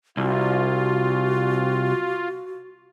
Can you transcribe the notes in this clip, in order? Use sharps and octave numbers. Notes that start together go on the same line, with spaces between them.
C2 F4 F#4